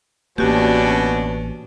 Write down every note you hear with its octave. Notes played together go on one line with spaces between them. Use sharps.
A1 B2 A#3 C#4 D4 F#4 G4